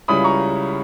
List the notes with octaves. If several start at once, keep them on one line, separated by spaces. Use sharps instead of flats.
C#2 C#3 G3 C#4 E4 B5 D#6
A#5 C#6